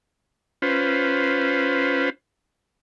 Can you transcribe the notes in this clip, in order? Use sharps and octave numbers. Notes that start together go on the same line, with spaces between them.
C#4 F4 B4 C5